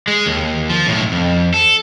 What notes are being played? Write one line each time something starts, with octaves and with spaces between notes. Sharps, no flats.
G#3
D#2
F3
B1 A2
F2
A4